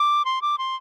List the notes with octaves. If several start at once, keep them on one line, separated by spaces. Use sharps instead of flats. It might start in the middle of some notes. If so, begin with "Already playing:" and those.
Already playing: D6
C6
D6
C6